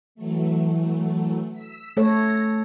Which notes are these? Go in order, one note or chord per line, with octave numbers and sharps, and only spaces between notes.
E3 F#3 A3
E6 B6
A3 A4 C#5 A#6